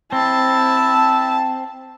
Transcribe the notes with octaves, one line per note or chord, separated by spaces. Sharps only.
C4 E4 A5